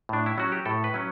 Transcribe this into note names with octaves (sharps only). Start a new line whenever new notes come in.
A2 D4
E4
F#3 C#4 F#4
G4
A2 A4
B4
F#3 C#4